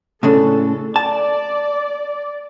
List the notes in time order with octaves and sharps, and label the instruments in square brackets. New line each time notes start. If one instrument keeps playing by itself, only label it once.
[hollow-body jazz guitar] A2 C#3 D4 [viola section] A4
[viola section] D5 [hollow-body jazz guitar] A5